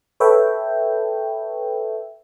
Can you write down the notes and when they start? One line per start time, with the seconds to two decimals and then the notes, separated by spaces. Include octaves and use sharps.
0.20 A4 B4 C#5 E5 G5